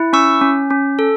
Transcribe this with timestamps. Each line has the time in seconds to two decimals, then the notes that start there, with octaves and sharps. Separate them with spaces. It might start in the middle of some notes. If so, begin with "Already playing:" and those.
Already playing: E4
0.13 C#4 C#6 E6
0.41 C#4
0.70 C#4
0.99 A4